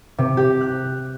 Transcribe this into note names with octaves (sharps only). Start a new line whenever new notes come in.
C3
G4
F#6